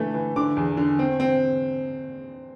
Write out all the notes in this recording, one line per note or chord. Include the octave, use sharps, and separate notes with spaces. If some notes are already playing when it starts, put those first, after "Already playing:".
Already playing: D3 E3 A3
E3
D3 D6
E2
D3
C4
C4